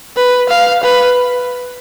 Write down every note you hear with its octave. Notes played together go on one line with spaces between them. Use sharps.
B4
F5
B4